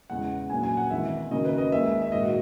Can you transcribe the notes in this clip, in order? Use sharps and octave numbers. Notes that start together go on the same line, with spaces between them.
E2 C#3 E3 G#3 F#5
A#1 A#2 F#3 G#5
G#5
F#5
G#1 G#2 E3 E5
F#1 F#2 D#3 F#3 D#5
B4
D#5
D#2 D#3 G#3 E5
E5
A#1 G#2 D#3 D#5
F#4